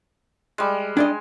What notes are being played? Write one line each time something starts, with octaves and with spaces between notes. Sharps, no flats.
G3 G#3
D4 D5 D#5 G#5